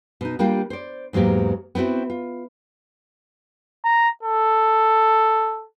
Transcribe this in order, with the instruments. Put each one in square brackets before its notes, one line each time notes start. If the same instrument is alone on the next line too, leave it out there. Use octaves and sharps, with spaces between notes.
[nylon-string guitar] B2 D#4
G3 A#3 D4 F4 G4
C5 D5
E2 G#2 F#3 A#3 G4
B3 C4 E4 F#4
F4
[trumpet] A#5
A4